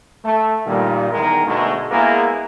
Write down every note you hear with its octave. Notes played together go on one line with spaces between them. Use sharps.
A3
G2 A#2 D#3 G3
E2 D#3 G#3 A#4
G#2 B2 D3 G#3 A3 F#4
G#3 A#3 B3 E4 G#4 A#4